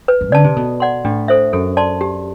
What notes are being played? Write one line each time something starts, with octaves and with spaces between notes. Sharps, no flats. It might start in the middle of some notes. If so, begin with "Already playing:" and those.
B4
F#2
D3 D5 A5
C3
B2 A4
D5 F#5 C6
A2 D4
A4 C5 E5
F#2 A4
D5 A5 C6
G4